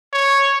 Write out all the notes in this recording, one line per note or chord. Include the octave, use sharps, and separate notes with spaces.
C#5